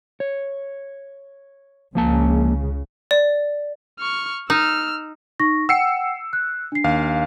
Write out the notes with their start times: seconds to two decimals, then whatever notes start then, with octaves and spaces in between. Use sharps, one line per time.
0.20 C#5
1.95 C#2 C#3 F3 A#3 A5
3.11 D5
3.99 C#6 F6
4.50 D#4 E6 F6
5.40 D#4 C#6 A#6
5.69 F#5 G5 E6 C7 C#7
6.33 F#6
6.72 D4 C7
6.84 D#2 F5